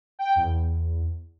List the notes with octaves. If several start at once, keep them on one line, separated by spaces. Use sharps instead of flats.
G5
E2